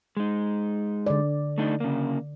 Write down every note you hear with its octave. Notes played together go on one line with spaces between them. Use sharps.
G#3 D#4
D3 D5
A3 D4 D#4
C#3 A#3